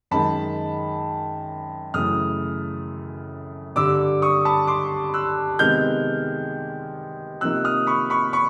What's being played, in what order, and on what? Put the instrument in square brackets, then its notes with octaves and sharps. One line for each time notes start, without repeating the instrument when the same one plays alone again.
[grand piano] F#2 D#3 G#3 A5 B5
F#2 C#3 E3 A3 D#6 F6
G2 D3 G3 D6 E6
C#6 D#6
A5 B5
C6 D6
E6 F#6
C3 D#3 G#3 B3 F6 G6
C3 F3 A#3 D#4 E6 F#6
D#6 F6
B5 C#6
B5 C#6
B5 C#6